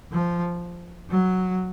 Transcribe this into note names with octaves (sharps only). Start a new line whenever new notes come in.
F3
F#3